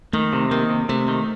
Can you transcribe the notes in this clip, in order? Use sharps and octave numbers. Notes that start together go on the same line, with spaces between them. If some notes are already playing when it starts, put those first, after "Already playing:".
D#3 A3
C3
D#3 A#3
C3
C3 A3
D#3